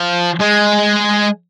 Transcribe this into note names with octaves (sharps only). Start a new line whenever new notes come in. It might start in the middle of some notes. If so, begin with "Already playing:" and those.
Already playing: F3
G#3